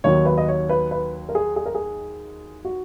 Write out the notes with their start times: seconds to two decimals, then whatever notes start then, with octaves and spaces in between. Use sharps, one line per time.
0.04 D#2 D#3 F#3 C#5
0.25 B4
0.38 D#5
0.48 C#5
0.69 B4
0.91 B4
1.29 A#4
1.35 G#4
1.56 G#4
1.66 A#4
1.75 G#4
2.65 F#4